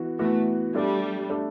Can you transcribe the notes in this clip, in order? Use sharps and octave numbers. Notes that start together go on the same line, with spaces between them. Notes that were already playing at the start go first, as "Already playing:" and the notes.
Already playing: E3 B3 F#4
E3 A3 B3 F#4
G3 A3 D4 A4 D5
A3 D4 A4 D5